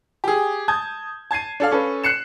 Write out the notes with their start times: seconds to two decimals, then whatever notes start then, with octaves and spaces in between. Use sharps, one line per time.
0.24 G4 G#4
0.68 A5 D#6 G6 G#6
1.31 A5 G#6 C7 D#7
1.60 D4 A4 F5
1.71 C#4 A4 B4
2.04 F#6 C7 C#7 E7